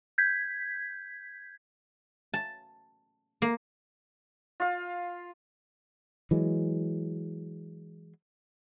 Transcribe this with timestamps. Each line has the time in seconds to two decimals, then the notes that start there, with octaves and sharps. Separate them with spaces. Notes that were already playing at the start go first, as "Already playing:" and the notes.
0.18 G6 G#6 B6
2.34 A5
3.42 A#3
4.60 F4 F5
6.31 E3 F#3 G#3